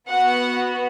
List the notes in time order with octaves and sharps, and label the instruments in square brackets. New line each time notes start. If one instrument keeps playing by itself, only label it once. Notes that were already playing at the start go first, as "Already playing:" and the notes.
[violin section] B3 F#4 F#5